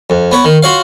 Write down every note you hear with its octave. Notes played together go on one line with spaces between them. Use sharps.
F2
B3 C#5
D#3
F4 F#4 C#5 F5